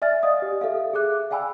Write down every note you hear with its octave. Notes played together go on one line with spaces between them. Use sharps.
D5 E5 G#5 F6 A6
D5 D#5 F5 D#6
G4
G4 A4 E5 F5
G#4 E5 D6 F#6
D5 F5 G5 G#5 B5 E6